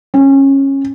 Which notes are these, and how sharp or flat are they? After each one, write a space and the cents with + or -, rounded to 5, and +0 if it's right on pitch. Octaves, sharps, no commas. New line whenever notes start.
C#4 -20